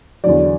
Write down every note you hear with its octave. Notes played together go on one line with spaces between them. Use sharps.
E2 D3 F#3 D5